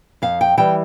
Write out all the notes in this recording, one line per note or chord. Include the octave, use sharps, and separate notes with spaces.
F2 F5
G5
E3 G3 G5